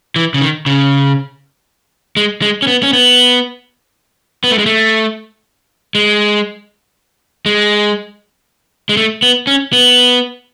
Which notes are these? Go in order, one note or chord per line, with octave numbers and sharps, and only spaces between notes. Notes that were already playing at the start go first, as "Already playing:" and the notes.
E3
C#3
D#3
C#3
G#3
G#3
C#4
B3
C#4
B3
B3
A3
G#3
A3
G#3
G#3
G#3
A3
B3
C#4
B3